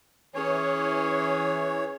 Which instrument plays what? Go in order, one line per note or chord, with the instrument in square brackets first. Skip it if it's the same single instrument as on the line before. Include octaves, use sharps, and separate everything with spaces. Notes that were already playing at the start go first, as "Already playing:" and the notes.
[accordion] E3 C#5 [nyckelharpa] C#4 G#4